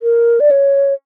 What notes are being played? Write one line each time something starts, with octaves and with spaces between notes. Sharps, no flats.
A#4
D5
C#5